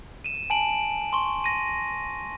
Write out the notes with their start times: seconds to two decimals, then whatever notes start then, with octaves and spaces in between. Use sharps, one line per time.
0.24 D#7 E7
0.50 G#5 A5 D7 F#7
1.13 C6 C#6
1.44 A#6 D#7